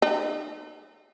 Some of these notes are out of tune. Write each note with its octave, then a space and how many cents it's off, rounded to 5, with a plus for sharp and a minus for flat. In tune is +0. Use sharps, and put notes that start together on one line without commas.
D#4 -35